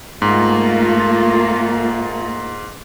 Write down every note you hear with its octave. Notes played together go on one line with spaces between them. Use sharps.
G#2 A3 A#3 F4